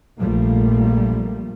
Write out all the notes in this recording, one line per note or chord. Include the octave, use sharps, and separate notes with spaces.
A#1 F3 G3 A3 A#3